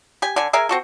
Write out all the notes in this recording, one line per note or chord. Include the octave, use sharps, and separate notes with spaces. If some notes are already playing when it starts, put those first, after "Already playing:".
G4 G#5
D3 G#5
G#4 A#4 E5 G#5
C4 F#4 A4